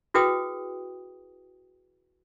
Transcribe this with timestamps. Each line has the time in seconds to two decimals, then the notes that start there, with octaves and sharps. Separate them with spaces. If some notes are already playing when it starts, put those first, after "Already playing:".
0.14 E4 F#4 G#4 B4 G5 D#6